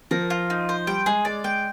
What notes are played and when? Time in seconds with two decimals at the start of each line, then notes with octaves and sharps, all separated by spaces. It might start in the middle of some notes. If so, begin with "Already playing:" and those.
0.11 F3 A#4
0.30 F4
0.50 D#4
0.69 C5
0.87 G3 G5
1.06 G#3 G#4
1.25 G#3 D5
1.44 G#3 G5